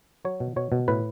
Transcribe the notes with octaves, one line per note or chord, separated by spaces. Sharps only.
F#3 C#5
B2
B2 C#5
B2
A2 B4